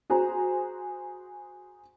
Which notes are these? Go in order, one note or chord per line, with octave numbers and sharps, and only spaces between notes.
F#4 G#4 C5 A#5